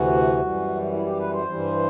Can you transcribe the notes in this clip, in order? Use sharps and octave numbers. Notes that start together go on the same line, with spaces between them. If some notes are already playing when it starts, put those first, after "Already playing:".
Already playing: D2 C3 E3 F#4
F#2 E3 G3
E4
G4
B4
C5
G2 E3 G3